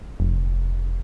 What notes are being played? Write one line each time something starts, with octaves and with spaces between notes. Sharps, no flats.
F1